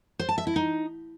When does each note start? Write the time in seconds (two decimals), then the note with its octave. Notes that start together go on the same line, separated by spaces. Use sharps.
0.19 C5
0.29 A5
0.38 E5
0.47 E4
0.56 D#4